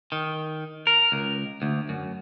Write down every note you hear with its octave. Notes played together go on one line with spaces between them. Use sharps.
D#3
A#4
C#2
D2
F#2